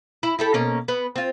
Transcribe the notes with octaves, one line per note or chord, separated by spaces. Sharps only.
E4
E4 G4 A4
B2 A#3 C#4
B3
C4 F4